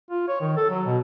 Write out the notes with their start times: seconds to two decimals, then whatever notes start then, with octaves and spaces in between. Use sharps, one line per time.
0.10 F4
0.28 C#5
0.41 D#3
0.57 A4
0.70 F#3
0.86 B2